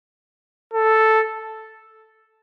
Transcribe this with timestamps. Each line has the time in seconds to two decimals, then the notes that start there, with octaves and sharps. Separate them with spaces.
0.74 A4